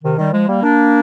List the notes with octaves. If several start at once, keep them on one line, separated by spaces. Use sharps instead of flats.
C3 D#3
D#3 G3
F3 G#3
G3 A#3
A#3 D4